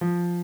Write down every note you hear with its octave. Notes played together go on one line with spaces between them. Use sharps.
F3